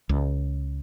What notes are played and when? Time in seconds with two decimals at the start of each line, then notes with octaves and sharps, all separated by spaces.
0.09 C#2